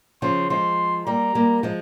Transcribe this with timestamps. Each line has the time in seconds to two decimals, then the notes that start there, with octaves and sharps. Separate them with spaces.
0.22 C#3 F3 C6
0.50 F3 G#3 C6
1.07 G3 A#3 A#5
1.35 G3 A#3
1.63 F3 G#3